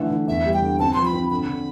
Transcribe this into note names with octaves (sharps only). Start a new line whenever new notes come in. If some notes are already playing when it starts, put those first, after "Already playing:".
Already playing: D3 E3 A3
E3
E2 E5
G3
G5
D3
C4 A5
F3 C6
B5
C4
D3 B5
D3